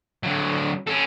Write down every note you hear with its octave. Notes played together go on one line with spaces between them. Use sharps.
D3 F#3
C#4 A4